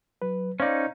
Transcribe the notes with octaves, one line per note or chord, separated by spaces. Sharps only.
F#3 B4
C#4 D#4 C5 D5 F5